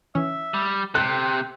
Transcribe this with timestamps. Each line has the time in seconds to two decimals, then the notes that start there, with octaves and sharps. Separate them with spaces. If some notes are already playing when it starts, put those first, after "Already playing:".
0.15 E3 C#4 E5
0.54 G3
0.95 C3 A4 G5 F#6